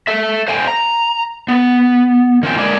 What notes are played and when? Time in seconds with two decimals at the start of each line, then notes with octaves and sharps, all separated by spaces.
0.07 A4 E5
0.48 C5 F5 G5 G#5
0.68 A#5
1.48 B3
2.43 D#3 F3 C#4 G5
2.57 D3 G#3 A#3 G#4 D5